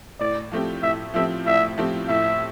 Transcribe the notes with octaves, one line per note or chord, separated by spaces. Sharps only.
A2 D5
F3 A3 C4 G4
A2 E5
F3 A3 C4 G4 E5
A2 E5
F3 A3 C4 G4
A2 E5